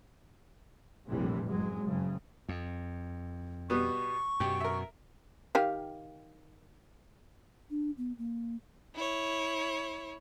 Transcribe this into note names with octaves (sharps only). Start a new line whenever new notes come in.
A#1 F2 A2 C3 E3 G3
F#1 F#3 G#3
F#1 C#3
F2
B2 G3 B3 C#6
F#2 B2 G4
A#4 E5
D#3 G4 F5
D4
B3
A#3
E4 C#5